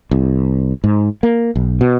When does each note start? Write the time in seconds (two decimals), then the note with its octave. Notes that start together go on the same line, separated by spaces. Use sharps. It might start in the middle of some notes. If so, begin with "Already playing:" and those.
0.11 C2
0.84 G#2
1.23 A#3
1.56 B1
1.81 B2